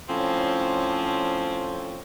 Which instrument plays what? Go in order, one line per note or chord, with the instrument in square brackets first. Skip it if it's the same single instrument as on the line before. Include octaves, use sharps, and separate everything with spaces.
[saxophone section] A2 F3 C4 C#4 C#5